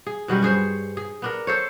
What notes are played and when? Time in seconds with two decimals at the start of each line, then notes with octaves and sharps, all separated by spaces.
0.06 G#4
0.28 B2 F#3 G3 C#4
0.42 G2 G#4 C5 C#5
0.97 G#4
1.22 B3 D4 A#4
1.47 A4 C5 C#5